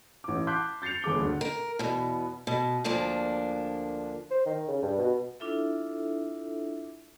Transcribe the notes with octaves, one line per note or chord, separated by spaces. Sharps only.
A1 D6
A5 C6 D6 F#6 G6 B6
G6 A6 C7 C#7 F7
G1 G#4 D6 G7
D2
A#4
E2 B2
B2
D2 F3 A#3 D4
C5
D#3
C#3
G2
B2
D4 E4 F4 A4 E5